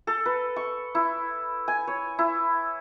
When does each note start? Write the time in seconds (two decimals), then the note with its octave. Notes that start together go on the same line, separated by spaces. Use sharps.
0.07 A4
0.26 B4
0.56 C#6
0.95 E4
1.68 G#5
1.87 C#5
2.19 E4